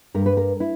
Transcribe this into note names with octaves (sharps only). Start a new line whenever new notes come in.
G2 A#4
B4
A#4
E4